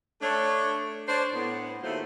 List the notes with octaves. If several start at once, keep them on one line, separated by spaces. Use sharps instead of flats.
A3 D4 C#5
D4 C5 C#5
A2 B3
D#2 A2 F#3 A3 F4 C5